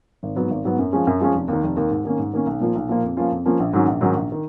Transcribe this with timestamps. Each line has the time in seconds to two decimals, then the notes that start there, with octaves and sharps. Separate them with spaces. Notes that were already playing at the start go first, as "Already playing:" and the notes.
0.23 G#1
0.36 G#2 F#3 B3
0.50 G#1
0.65 G#2 F#3 B3
0.79 F#2
0.93 F3 G#3 C#4
1.07 F#2
1.20 F3 G#3 C#4
1.35 F1
1.48 D#2 D#3
1.63 F1
1.77 D#2 D#3
1.91 G#2
2.05 D#3 A#3 C#4
2.19 G#2
2.33 D#3 A#3 C#4
2.46 B1
2.60 A#2 F3 A#3 F4
2.75 B1
2.89 A#2 F3 A#3 F4
3.04 F2
3.17 F3 A#3 C#4 F4
3.32 F2
3.46 F3 A#3 C#4 F4
3.60 A#1
3.73 G#2 D#3 F#3 C#4
3.88 A#1
4.01 G#2 D#3 F#3 C#4
4.15 A#1
4.32 D#3